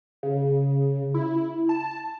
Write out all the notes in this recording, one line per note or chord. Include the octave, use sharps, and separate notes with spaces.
C#3
E4
A5